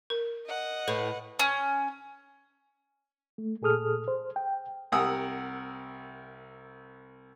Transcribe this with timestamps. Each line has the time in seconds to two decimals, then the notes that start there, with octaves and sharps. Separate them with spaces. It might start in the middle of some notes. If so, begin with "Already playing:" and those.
0.10 A#4
0.46 D#5 F#5
0.88 A2 B4
1.39 C#4
3.38 A3
3.62 A#2 G#4 A4 D#6 F6
4.08 C5
4.36 G5
4.92 C2 C3 A#4 F#5 D#6 E6